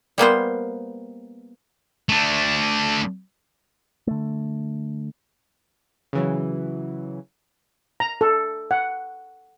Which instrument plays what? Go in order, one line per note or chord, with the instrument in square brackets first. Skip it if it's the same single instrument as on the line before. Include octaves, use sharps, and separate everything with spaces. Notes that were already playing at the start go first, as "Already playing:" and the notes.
[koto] G3 A#3 B3 C5
[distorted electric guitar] A3 D4
[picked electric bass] D3 A3
[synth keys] C#3 E3 F#3
[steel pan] A#5
A4
F#5